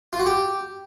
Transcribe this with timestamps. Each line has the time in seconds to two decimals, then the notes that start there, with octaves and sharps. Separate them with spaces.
0.13 F4
0.19 F#4
0.26 G4